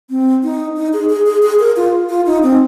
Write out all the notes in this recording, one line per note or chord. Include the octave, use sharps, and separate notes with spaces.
C4
D#4
D#4
G#4
G#4
G#4
G#4
A#4
F4
F4
D#4
C4